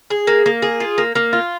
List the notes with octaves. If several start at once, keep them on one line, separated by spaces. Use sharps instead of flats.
G#4
A#3
A#3
G#4
F4
A#3
A#3
F4